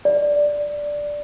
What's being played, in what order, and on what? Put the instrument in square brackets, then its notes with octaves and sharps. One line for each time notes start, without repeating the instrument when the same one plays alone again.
[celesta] D5